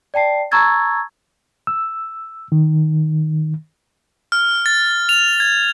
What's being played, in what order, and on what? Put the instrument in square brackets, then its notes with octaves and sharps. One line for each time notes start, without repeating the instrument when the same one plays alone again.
[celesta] D5 G5 A5 C7
A5 A#5 C#6 E6 G#6 A6
[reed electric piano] E6
D#3
[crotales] F6
A6
F7
G#6